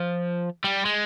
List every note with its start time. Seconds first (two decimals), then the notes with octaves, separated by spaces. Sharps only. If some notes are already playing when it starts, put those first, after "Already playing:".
Already playing: F3
0.64 G3
0.85 G#3